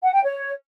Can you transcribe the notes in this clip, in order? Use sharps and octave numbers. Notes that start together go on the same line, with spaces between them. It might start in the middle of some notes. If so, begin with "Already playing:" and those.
F#5
G5
C#5